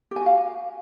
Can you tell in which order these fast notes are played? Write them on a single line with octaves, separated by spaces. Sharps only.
G4 G#5 F#4 F5